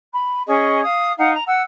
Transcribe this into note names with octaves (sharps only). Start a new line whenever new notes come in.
B5
C#4 G#4 D#5 C#6
F5 D#6
D#4 F5 F#5
A#5
F#5 E6